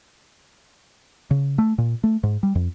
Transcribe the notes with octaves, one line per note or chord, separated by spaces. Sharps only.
C#3
A3
A#2
A3
G#2
G3
F2